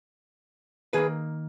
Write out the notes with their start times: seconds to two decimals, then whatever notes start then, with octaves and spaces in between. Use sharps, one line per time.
0.93 D#3 A#3 G#4 B4